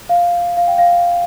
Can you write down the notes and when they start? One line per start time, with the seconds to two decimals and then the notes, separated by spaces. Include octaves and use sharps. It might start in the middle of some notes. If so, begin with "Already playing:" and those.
0.09 F5
0.57 F5
0.67 G5
0.78 F5